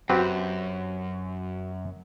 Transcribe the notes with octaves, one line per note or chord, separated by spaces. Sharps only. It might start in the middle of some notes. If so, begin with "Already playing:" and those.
F#2 C4 F#4 G4 B4